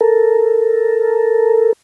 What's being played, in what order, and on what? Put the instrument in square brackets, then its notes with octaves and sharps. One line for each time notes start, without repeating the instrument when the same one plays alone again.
[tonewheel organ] A4 A#4